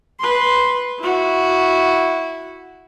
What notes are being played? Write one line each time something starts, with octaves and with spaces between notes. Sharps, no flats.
B4 C6
E4 F#4